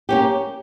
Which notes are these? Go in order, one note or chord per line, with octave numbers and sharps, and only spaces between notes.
A#3 C#4 G4